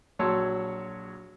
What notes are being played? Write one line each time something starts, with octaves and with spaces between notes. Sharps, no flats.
A#1 F#3 C#5 A5 C6 E6